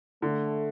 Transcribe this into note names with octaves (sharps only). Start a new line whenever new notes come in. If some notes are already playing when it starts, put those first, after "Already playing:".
D3 A3